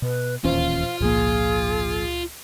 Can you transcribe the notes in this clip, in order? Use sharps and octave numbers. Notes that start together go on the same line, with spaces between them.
B2 B4
D1 D#2 A#2 E3 C#4 F4 C5 F5
G#1 C#2 A#2 F3 A#3 G#4